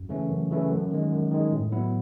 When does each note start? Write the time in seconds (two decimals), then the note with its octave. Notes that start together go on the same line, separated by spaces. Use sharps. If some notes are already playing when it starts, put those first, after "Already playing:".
Already playing: F#2
0.09 C#3 E3 A3 C#4
0.29 F#2
0.50 C#3 E3 A3 C#4
0.70 F#2
0.91 D#3 G#3
1.11 F#2
1.31 D#3 G#3
1.51 A2
1.72 F#3 B3 E4